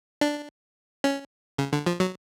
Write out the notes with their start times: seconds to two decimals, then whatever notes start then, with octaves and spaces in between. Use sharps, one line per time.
0.21 D4
1.04 C#4
1.58 C#3
1.73 D3
1.86 F3
2.00 F#3